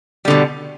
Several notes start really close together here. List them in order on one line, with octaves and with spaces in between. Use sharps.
G3 D3 B2